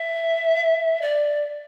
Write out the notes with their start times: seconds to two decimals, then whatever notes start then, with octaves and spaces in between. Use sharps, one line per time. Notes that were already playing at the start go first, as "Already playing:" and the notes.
Already playing: E5
1.01 D5